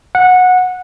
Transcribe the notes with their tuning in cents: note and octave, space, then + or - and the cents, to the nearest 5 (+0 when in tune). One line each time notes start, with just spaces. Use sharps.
F#5 -15